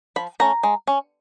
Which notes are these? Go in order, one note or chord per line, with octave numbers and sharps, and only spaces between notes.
F3 B5
A3 C#4 A#5
G#3
C#4